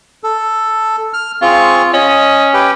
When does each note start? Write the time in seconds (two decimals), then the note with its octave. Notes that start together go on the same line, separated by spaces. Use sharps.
0.24 A4
1.14 F6
1.42 C4 F4 G#4 C#6
1.94 C#4 D#5
2.54 G4 B4 G5